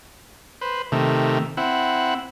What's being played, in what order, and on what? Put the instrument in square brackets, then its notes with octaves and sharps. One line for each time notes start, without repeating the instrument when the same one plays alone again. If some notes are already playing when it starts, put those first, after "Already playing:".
[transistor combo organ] B4 C5
C3 D#3 A3
C4 E4 F#5